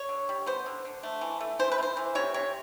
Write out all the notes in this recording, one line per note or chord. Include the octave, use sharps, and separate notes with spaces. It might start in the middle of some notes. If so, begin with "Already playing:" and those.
Already playing: C#5
D3
G3
B3 C5
D3
D3
A3
E3
A3
E3 C5
B4
A3
C5
E3
C3 C#5
C3 C#5